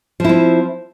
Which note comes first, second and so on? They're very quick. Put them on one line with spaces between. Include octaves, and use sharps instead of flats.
F3 E4 C4